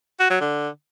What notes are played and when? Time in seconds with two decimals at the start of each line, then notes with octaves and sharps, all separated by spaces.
0.20 F#4
0.30 F#3
0.41 D3